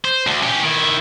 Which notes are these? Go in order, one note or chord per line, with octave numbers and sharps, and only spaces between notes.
C5
D2
C#4 G4
D#3 E4